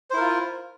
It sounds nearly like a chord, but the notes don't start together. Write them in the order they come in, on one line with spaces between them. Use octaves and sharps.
C5 E4 A#4 F4